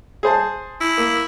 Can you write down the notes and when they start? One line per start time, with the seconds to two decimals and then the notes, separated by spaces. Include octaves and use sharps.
0.23 G#4 C5 A5
0.81 E4
0.98 A#3